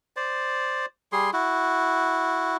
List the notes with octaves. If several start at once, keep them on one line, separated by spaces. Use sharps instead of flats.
C5 D5
G3 G#4 C6
E4 F#4